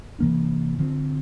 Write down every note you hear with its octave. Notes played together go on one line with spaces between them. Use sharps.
C3 E3 A#3 D4
D3 F3 C4